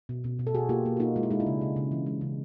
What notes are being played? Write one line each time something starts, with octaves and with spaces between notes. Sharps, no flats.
B2
B2
B2
A4
B2 F#4 G#4
A#3 F4 G4
A#3
F#4
A#3 D#4 F4
G#3 F4
E4
G#3 D#4
D4 E4
C#3
C#3
C#3
E3
G#3
C#3